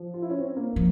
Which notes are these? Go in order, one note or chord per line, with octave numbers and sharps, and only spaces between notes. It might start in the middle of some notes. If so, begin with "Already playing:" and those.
Already playing: F3
F4
E4
C#4
C4
A#3
F3